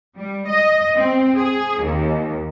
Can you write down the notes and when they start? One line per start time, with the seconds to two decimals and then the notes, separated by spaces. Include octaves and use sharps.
0.18 G3
0.48 D#5
0.95 C4
1.36 G#4
1.83 D#2